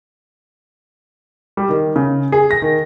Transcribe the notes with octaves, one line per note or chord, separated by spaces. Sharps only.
G3
D#3
C#3
G#4
A#6
D#3